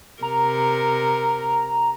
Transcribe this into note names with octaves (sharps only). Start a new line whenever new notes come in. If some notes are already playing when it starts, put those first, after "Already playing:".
C3 A#4 A#5